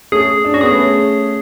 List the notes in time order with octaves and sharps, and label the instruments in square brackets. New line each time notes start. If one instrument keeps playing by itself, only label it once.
[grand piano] A3 C#4 [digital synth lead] G#4
[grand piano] D4
[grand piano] C#4 [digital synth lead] F#4
[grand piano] B3 [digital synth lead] G#4
[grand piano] A3 C#4